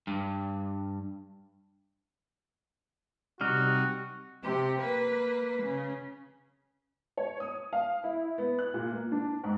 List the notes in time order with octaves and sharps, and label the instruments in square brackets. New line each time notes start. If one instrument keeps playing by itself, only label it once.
[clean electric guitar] G2
[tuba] C3 [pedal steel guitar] G3 D#4 F6 [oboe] F#4
[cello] C3 G4
A#3 B4
C#3
[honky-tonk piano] C#5
D#6
F5
E4
B3
F#6
A#2
A#3
D4
G#2